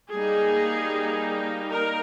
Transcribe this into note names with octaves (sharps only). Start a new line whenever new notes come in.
G3 A#3 D#4 G#4
A#4